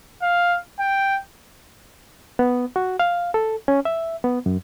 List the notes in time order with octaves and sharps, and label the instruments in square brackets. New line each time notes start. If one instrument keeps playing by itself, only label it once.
[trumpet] F5
G5
[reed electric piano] B3
F#4
F5
A4
C#4
E5
B3
F#2